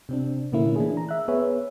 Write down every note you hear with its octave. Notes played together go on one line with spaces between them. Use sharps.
C3 C4 D4
A#2 D3 A3 A#3 C#4 E4
E3 D4 E4 G#4
A#5
E5 F#6
B3 G#4 B4 C#5 E5